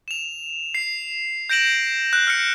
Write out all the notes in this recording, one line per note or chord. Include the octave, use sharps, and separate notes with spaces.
E7 F7
C7
G6 A#6 D7 E7 F#7
F#6
F6 C#7